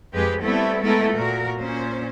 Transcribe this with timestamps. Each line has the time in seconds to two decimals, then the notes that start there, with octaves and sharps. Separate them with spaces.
0.13 F2 G#3 G4 G#4 B4
0.42 G3 A3 B3 C4 E4
0.82 G#3 A3 B3 E4 A#4
1.12 A#2 F#4 A#4
1.58 A#2 C#4 C5